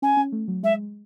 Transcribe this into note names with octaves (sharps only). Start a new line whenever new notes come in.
C#4 G#5
C#4
A3
F#3
G#3 E5